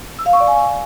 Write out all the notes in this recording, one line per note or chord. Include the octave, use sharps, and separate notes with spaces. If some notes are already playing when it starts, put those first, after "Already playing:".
E6
F5
C#6
D5
G#5